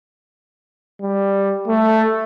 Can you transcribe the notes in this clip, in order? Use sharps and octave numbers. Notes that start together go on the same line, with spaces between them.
G3
A3